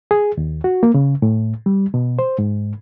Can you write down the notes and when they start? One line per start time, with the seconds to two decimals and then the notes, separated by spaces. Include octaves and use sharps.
0.11 G#4
0.38 D#2
0.64 F#4
0.83 A#3
0.94 C#3
1.22 A2
1.66 G3
1.94 B2
2.19 C5
2.39 G#2